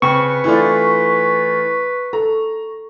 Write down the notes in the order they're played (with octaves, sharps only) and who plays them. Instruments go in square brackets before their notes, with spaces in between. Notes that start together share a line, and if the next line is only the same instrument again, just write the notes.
[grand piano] C#3 [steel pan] C4 G5 [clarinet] B4 [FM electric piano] C#6
[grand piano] E3 A3 F4 [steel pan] D4 E4 D5
[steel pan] A4 [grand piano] A#5